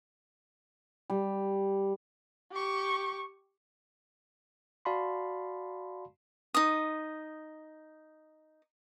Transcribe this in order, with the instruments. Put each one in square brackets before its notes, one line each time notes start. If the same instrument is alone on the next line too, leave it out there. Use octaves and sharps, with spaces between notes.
[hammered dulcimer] G3
[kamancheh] G4 C#6
[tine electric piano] F#4 D5 F5 A5 B5 C6
[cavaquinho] D#4 D#6